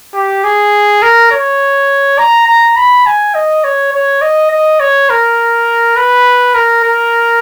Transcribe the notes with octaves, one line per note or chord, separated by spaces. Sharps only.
G4
G#4
A#4
C#5
A#5
A#5
B5
G#5
D#5
C#5
C#5
D#5
D#5
C#5
A#4
B4
A#4
A#4